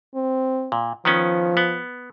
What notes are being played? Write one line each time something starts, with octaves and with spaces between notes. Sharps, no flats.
C4
A#2
D#3 F3 B3 C#4
B3